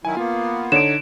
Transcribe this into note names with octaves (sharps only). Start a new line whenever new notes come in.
D#3 F#3 E4 G#5
A#3 B3 F4
D3 D#4 C#5 D7 E7